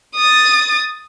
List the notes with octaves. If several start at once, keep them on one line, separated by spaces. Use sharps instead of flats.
D#6 A6